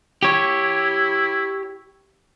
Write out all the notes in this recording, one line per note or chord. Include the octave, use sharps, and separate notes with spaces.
E4 G4 C#5